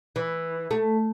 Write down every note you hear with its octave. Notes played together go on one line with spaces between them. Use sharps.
E3
A3